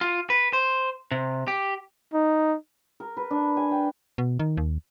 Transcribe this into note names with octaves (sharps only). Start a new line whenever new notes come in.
F4
B4
C5
C3
G4
D#4
A#4
B4
D4
G#5
G5
B2
D#3
D#2